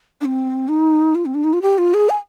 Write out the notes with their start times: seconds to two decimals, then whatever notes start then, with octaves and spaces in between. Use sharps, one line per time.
0.21 D4
0.25 C4
0.68 D#4
1.15 F4
1.26 C4
1.35 D4
1.44 D#4
1.53 F4
1.62 G4
1.78 F4
1.94 G#4
2.09 G#5